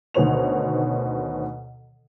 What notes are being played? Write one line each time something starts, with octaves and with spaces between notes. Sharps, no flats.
D2 B2 D#3 C5 C#5 F7